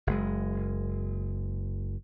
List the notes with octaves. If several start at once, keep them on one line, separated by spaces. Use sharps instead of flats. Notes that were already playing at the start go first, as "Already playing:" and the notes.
F#1 G#3